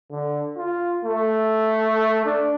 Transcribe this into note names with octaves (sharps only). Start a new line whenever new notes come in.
D3
F4
A3
D4